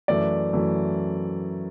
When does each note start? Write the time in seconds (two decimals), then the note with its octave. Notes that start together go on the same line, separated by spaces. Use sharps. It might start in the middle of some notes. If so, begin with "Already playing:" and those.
0.08 F#2 E3 A3 D5
0.53 F#2 E3 A3